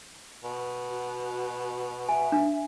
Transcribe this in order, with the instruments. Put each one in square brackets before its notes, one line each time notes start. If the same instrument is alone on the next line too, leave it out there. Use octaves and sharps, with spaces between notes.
[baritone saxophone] B2
[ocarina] F#4
[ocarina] E5 [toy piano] G#5
[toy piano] D4